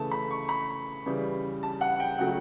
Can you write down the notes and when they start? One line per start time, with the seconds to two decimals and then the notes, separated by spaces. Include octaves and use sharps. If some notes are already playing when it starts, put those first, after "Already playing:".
Already playing: C#3 E3 A3 A5
0.11 B5
0.31 C#6
0.49 B5
1.06 C#3 E3 G3
1.63 A5
1.81 F#5
2.00 G5
2.18 C#3 F#3 A3 F#5